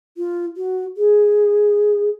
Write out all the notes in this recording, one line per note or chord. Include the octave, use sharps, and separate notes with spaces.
F4
F#4
G#4